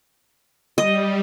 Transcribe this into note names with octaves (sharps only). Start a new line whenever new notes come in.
G3 D#5